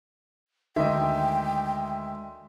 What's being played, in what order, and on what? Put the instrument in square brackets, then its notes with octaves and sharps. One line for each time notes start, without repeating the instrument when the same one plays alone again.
[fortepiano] D2 D#3 [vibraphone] G#3 C6 [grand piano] D#5 E5 [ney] G5